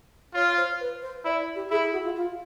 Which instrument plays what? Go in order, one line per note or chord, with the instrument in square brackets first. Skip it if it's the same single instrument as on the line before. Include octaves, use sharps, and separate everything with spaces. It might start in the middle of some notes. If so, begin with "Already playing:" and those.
[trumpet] F4 [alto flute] C#5
[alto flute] C5
B4
C5
[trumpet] E4 [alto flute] D5
[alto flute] G4
[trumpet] E4 [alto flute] G#4
[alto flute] G#4
F#4
F4
F4